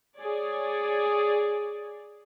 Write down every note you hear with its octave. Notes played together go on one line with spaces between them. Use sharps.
G#4 C#5 D5